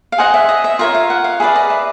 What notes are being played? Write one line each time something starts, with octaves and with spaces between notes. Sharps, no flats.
F5
G#4 C5 D#5 F#5
E5
D#5
E5
F4 A#4 C#5 E5
F5
F#5
F5
G#4 B4 D5 E5
D#5
E5